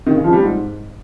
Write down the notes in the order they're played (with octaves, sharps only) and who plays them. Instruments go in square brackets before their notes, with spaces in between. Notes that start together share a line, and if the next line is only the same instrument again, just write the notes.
[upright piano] D#3
C#3
F3
G3
G#2